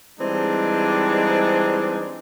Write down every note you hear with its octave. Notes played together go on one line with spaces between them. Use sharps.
E3 G3 G#3 C4 D4 D#4